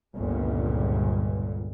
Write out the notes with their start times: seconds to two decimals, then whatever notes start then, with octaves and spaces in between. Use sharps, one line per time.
0.15 G1 C#2 A#2